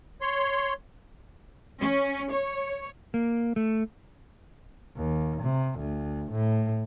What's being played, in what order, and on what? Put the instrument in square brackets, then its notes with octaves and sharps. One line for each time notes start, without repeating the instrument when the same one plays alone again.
[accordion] C#5 C6
[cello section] C#4
C#5
[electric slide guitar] A#3
A3
[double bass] D#2
C3
D2
A2